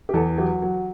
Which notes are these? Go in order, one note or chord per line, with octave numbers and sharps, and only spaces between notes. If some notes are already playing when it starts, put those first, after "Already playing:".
G4
E2 A4
F#3 G4
F#3